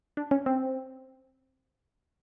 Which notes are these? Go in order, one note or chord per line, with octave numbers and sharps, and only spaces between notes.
D4
C#4
C4